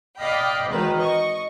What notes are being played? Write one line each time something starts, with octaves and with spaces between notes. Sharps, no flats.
D5 D#5 F5 G5 B5
G#1 D#3 E3 B4
D#5 C#6